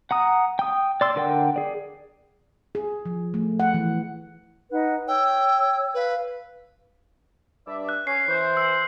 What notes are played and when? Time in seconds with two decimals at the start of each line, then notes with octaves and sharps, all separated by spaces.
0.11 F#5 A#5 D#6
0.59 G5 D#6
1.01 D5 C6 E6
1.16 D3 A#4 F#5 G5
1.56 G#4 D5
2.75 G#4
3.06 F3
3.34 A3
3.60 F#5
3.74 E3
4.71 D#4 B4 F#5
5.08 C#5 G5 E6
5.94 B4 F5
7.67 G2 D5 E5
7.89 F#6
8.07 C#4 C7
8.27 E3 C5
8.57 E6